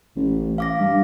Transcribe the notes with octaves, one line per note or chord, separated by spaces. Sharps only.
A1
F5 D6 A#6
G2